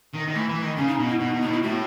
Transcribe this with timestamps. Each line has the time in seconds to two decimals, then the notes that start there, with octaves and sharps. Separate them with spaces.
0.13 D#3
0.27 D#3
0.34 E3 A3
0.49 E3
0.62 D#3
0.77 C#3 C#4
0.88 D#4
0.98 B2
1.09 E4
1.19 B2 D#4
1.34 B2
1.41 A2 D#4
1.48 B2 E4
1.62 A2 F#4